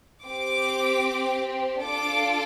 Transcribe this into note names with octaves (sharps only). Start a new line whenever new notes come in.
C4 G4 D6
D4 F4 A4 D6